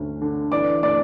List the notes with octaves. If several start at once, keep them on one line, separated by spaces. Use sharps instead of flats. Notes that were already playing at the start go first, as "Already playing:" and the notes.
Already playing: D2 C#4
D3
E3 D5 D6
A3 D5 D6